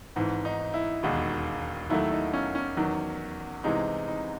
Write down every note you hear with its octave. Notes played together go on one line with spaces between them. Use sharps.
G#1 G#2 E3
D#4
E4
E1 D#2 D#3 G#3 F#4
D#2 D#3 F#3 A3 E4
D#4
C#4
C#4
E2 D#3 F#3
C2 C3 E3 G#3 D#4
D#4